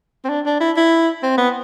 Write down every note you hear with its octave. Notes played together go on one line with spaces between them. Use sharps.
C4
D4
D4
E4
E4
C4
B3